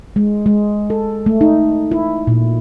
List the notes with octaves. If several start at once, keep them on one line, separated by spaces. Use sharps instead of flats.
G#3
G#3
A4
A3
D#4
E4
A#2